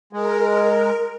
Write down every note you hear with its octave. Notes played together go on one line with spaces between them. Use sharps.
G#3 A#4